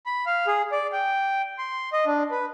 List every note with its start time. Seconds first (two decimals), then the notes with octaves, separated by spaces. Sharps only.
0.06 B5
0.26 F5
0.47 G#4
0.72 D5
0.93 G5
1.59 C6
1.93 D#5
2.06 D4
2.31 B4